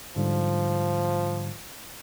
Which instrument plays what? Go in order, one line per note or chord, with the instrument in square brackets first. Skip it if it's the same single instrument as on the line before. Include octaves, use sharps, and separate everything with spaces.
[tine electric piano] G#2 D3 G3 [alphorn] F3